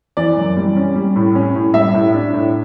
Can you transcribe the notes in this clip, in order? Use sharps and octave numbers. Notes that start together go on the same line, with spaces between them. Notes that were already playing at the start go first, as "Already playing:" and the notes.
E3 D5
F#2
G3
C#4
G3
A2
C#4
A2
G3 E5
A2
D4
A2